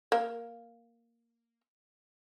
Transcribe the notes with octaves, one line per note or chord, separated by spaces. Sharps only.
A#3 A#4